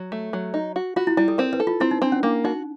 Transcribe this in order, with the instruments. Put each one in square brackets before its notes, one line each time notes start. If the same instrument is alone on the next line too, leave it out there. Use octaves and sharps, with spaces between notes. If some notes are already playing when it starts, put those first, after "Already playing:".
Already playing: [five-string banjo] F#3
A3
F#3
D#4
F#4
[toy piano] F4 [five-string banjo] F#4
[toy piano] E4
[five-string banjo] G3 [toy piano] E4
[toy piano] A4
[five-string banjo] C4 [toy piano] A#4
[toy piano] B4
[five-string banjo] A4
[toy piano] F4
[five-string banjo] C4 [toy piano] E4
[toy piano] D#4
[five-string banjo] C4 [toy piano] D4
[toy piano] C#4
[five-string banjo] A#3 [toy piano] D4
[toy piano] D#4 [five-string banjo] F#4